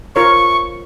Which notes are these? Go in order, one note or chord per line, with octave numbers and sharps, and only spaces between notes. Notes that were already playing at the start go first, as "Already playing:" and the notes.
F4 A#4 C#5 C#6